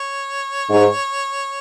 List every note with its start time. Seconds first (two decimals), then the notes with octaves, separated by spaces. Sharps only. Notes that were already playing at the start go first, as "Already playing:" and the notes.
Already playing: C#5
0.68 G#2